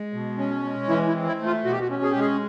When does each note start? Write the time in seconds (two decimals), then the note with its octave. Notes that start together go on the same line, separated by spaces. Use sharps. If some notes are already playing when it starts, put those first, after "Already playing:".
Already playing: G#3
0.13 B2
0.38 C#4
0.63 G#3
0.89 E3 E4
1.08 E4
1.14 C4
1.27 E4
1.40 A3
1.46 F4
1.64 B2 F#4
1.72 G4
1.81 F#4
1.90 C#4
2.03 G#4
2.11 G4
2.16 G#3 G#4